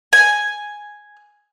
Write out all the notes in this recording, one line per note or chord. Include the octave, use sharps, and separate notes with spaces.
G#5